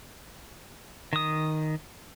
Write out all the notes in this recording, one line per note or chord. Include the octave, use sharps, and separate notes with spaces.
D#3 D#6